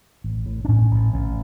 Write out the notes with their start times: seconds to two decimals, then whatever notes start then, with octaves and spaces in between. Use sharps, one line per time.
0.24 A1
0.46 A2
0.65 D4
0.68 A2 C#4
0.91 A1
1.13 A1 C#4